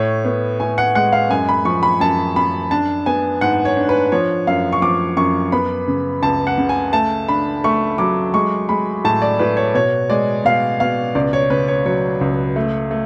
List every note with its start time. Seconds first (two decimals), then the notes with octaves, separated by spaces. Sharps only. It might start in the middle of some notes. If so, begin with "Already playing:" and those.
Already playing: A2 C#5
0.25 B3
0.60 A2 G#5
0.78 F#5
0.95 G#3 F#5
1.12 F5
1.30 F#2 G#5
1.49 B5
1.65 F3 C#6
1.83 B5
2.00 F#2 A5
2.36 F#2 B5
2.71 D4 A5
3.06 B3 G#5
3.41 G#2 F#5
3.65 C#5
3.77 D4
3.89 B4
4.12 F3 C#5
4.47 F#2 F5
4.73 C#6
4.82 F3 D6
5.17 F#2 C#6
5.52 B3 B5
5.88 C#3
6.22 C#2 A5
6.47 F#5
6.58 C#3
6.69 G#5
6.93 A3 A5
7.29 D4 B5
7.64 A3 C#6
7.98 F#3 D6
8.34 G#3 C#6
8.69 G#3 B5
9.04 A2 A5
9.22 D5
9.39 A2 B4
9.57 C#5
9.74 B2 C#5
10.10 G#3 D5
10.45 B2 F5
10.80 B2 F5
11.15 C#2 D5
11.33 C#5
11.50 C#3 B4
11.68 C#5
11.86 F#3 C#5
12.21 C#2
12.56 A3
12.91 A3